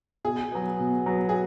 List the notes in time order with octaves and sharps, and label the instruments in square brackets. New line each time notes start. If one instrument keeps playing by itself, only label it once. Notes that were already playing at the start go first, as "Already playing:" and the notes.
[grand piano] B2 [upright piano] G#4
[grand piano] F#3 B3
B2
F#3 B3
[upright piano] G#4